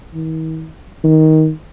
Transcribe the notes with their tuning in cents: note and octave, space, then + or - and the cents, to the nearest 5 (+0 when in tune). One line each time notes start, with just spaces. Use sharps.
D#3 +45
D#3 +15